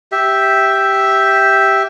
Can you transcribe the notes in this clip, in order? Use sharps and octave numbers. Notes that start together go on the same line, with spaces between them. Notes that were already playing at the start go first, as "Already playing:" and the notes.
G4 E5